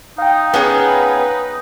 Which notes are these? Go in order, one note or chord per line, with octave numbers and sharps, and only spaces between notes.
D#4 F5 G5
B3 C#4 G#4 B4